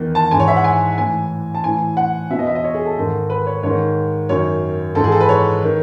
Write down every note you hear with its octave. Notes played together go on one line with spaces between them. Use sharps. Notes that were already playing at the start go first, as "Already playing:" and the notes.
Already playing: E2 D#3
A5
G#2 E3 G#5
C#5
E5
F#5
G#5
A2 E3 G#5
A5
A2 E3 G#5
F#5
E2 B2 E5
D#5
E5
D#5
C#5
G#4
A4
G#2 D#3
B4
C#5
G#2 D#3 C#5
F#2 D#3 C#5
G#2 E3 A4
G#4
A4
B4
C#5
D#3